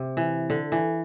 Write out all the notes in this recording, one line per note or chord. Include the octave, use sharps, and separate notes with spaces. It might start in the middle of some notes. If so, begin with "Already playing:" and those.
Already playing: C3
E3
D3
E3